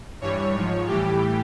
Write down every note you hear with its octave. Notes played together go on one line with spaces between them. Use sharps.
G2 E3 G3 C#5
G#2 F3
A2 E3 G3 G4